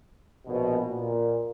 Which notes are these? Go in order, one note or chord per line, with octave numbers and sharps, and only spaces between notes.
A#1 B2
A#2